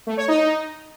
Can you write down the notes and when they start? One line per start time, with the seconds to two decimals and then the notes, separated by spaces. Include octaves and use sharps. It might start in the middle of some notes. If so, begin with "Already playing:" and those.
0.07 A3
0.17 C#5
0.28 D#4